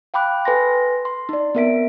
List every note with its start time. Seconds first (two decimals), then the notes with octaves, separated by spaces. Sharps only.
0.14 F5 G5 B5 D6 F#6
0.45 A4 B4 G#5 C6 A#6
1.05 C6
1.29 D#4 D5
1.55 B3 C4 A#4 E5 B6 D7